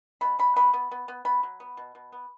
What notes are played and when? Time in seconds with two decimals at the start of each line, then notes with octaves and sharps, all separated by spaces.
0.21 B2 B5
0.39 B2 B5
0.56 B3 B5
0.74 B3
0.91 B3
1.08 B3
1.25 B3 B5
1.43 F#3
1.60 B3
1.77 B2
1.95 B2
2.12 B3